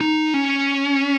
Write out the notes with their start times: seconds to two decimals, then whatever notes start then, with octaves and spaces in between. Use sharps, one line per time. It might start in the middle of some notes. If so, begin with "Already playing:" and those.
0.01 D#4
0.34 C#4